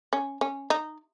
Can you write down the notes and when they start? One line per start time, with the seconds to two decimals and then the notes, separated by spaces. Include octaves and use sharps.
0.13 C#4
0.41 C#4
0.70 D#4